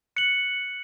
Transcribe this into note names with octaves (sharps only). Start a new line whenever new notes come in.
F#6 C#7 F#7